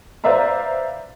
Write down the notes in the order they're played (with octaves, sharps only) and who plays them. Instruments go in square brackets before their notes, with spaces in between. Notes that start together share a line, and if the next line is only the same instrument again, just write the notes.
[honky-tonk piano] B4 C5 D5 E5 F5 A#5